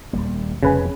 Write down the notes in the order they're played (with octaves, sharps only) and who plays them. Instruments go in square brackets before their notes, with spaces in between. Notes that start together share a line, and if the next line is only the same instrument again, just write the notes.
[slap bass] D#1 G3 A#3
[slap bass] F1 F2 A#2 [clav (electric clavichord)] C#3 B4 G#5